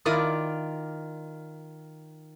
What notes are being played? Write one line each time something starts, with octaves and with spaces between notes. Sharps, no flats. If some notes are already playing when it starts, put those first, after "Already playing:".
D#3 E4 F4 A#4 D5 D#6